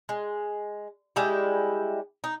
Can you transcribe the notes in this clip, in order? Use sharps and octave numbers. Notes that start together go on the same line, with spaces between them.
G#3
G3 G#3 E4 G4
D#4